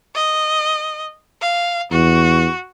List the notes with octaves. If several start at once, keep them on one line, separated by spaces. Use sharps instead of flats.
D#5
F5
E2 F#4